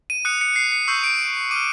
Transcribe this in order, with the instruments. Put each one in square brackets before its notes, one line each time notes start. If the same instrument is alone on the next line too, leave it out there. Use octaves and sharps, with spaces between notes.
[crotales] D#7
D#6 F#6 C#7
C#7
C7
C#7
C#6 E6 G6 C7
D7
D6 D#7
F6